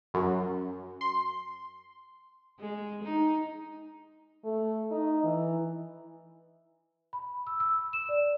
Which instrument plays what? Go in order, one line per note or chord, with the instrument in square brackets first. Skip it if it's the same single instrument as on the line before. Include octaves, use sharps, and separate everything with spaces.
[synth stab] F#2
C6
[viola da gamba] G#3
D#4
[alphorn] A3
D#4
E3
[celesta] B5
E6
E6
E7
D5